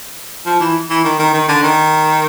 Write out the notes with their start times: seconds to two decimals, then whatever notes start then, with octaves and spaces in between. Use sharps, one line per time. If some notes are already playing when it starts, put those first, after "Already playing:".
0.46 F3
0.60 E3
0.90 E3
1.05 D#3
1.19 D#3
1.34 D#3
1.49 D3
1.64 D#3